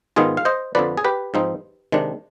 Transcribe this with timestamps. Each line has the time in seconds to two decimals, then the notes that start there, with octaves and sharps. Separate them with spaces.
0.16 G#2 D#3 B3 D#4 F4 G#4
0.37 F5
0.45 C5 D#5
0.75 F2 D3 F3 B4 D5
0.97 G#4
1.04 G4 B4
1.34 G#2 F3 C4 D#4
1.92 C3 D#3 G#3 D4